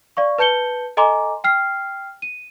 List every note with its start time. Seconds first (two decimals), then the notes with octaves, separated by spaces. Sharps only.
0.17 D5 F5 C#6
0.38 B4 A5 G6 C#7 G7
0.97 A4 D#5 G#5 A#5 C6 D6
1.44 G5 F6 C7
2.22 D#7